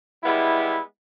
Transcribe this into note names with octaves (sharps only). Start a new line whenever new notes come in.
G3 G#3 B3 E4